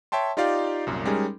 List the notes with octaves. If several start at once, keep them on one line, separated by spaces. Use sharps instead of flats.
C#5 E5 G5 A5 C6
D#4 F4 G4 D5 F5
C2 F#2 A#2
G3 G#3 C#4 D#4 G#4 A#4